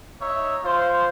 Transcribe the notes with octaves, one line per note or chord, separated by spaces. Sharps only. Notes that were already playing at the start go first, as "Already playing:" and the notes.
D#4 C#5 E5
F4 C5